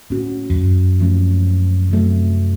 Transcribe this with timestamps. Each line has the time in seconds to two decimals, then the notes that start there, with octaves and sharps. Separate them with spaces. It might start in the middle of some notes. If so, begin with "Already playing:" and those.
0.10 A2 A#3 C#4 F#4
0.49 F2
0.55 F#2
1.00 F3 A3 C#4
1.89 C3 F#3 A3